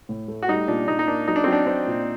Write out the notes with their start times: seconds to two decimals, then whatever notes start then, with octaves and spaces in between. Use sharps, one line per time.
0.09 A2
0.28 A3
0.43 F#4
0.48 G3 D#4
0.68 A#2 D4
0.88 A#2 D#4
0.99 D#4
1.07 A#3 D4
1.28 F#3 D#4
1.36 D4
1.44 F#3 C4
1.53 D4
1.67 C4 D4
1.87 A#2